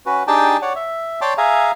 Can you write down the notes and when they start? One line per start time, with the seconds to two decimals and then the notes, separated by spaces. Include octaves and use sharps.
0.06 C#4 F#4 B4
0.27 D4 D#4 G4 G#4 G5 A5
0.62 C#5 D5 F#5
0.76 E5
1.21 C#5 D5 G5 A5 C6 D6
1.38 G#4 E5 F5 G#5 A#5